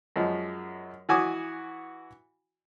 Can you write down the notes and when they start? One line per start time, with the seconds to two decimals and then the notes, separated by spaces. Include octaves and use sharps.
0.16 F#2 F3 G#3
1.09 E3 F#4 G#5 D6 D#6